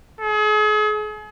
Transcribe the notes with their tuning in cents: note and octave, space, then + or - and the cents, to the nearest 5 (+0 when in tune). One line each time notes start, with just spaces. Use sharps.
G#4 +40